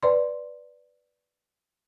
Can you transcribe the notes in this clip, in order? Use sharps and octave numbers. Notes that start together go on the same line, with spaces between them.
B4 D5 C6